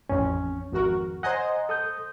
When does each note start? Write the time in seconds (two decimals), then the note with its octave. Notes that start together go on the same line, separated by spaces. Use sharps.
0.09 A1 F2 C#4
0.72 G#1 F2 F#4 A#4
1.23 C5 D#5 F#5 G#5 A#5
1.69 A4 D#6 G6